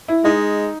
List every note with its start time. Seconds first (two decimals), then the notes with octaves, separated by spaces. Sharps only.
0.08 E4
0.25 G#3 D#4